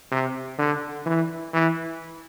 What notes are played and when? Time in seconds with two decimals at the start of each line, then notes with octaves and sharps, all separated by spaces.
0.12 C3
0.58 D3
1.06 E3
1.53 E3